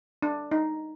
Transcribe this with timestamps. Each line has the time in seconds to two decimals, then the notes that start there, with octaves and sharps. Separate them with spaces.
0.22 D4
0.52 D#4